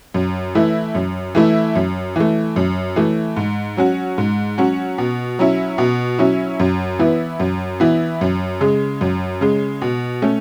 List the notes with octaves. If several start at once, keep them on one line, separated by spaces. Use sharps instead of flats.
F#2
E3 A3 E4
F#2
E3 A3 E4
F#2
E3 A3
F#2
E3 A3
G#2
F#3 C#4 F#4
G#2
F#3 C#4 F#4
B2
F#3 C#4 E4
B2
F#3 C#4 E4
F#2
E3 B3 E4
F#2
E3 B3 E4
F#2
C#3 G#3
F#2
C#3 G#3
B2
A3 C#4